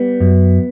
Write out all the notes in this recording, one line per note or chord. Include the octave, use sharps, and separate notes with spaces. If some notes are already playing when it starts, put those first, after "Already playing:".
Already playing: G3 B3
F#2